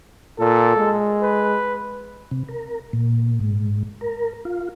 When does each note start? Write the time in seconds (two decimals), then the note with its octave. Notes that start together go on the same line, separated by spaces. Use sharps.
0.39 A#2 A4
0.77 G#3
1.22 B4
2.31 C3
2.49 A#4
2.93 A#2
3.40 G#2
4.01 A#4
4.45 F4